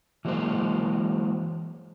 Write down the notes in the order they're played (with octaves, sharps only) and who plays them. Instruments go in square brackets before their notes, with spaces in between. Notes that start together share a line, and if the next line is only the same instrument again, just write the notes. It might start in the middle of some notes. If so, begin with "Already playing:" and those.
[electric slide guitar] E3 F#3 G#3 A#3 C5